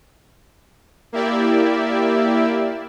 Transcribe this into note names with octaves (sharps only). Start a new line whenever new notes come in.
A#3 E4 G4 D5 E5